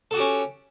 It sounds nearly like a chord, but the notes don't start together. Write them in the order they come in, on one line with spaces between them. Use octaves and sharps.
A4 F#4 G4 C#4